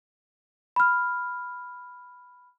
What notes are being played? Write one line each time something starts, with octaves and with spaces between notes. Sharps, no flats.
B5 F6